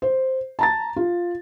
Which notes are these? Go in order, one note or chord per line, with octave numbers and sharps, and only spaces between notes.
C5
A5 A#5 A6
F4